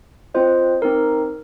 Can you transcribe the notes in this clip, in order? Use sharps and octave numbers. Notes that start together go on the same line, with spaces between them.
C4 F4 C5 D#5
C4 D#4 A#4